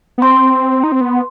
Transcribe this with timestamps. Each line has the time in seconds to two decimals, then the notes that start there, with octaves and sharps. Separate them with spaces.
0.18 B3
0.22 C4 C6
0.83 D#4
0.92 C4
1.01 B3